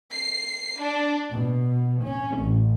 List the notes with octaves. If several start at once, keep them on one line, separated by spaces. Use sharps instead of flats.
C7
D4
B2
C#4
A1